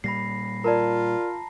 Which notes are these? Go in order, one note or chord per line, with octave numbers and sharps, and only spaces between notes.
A#2 G3 B5 A#6 C7
F4 A#4 D5 A5 A#5